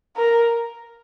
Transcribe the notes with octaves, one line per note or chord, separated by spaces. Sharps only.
A#4